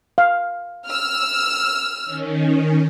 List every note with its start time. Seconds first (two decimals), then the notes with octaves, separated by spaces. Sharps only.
0.18 F5
0.85 E6 F6
2.05 D#3 C#4